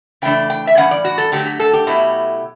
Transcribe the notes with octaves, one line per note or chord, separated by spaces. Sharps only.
C#3 E3 A3 D4 G5
G5
E5
A2 E3 G3 C#4 F#5
D5
F#4
A4
D3 F#3 A3 G4
G4
A4
G4
B2 F#3 A3 E4